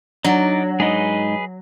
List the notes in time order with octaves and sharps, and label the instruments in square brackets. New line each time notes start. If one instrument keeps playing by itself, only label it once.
[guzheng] F#3 [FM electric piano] D4 [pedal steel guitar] D#4 D5
[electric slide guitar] G#2 D#4 [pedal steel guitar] G#4 B4 D#5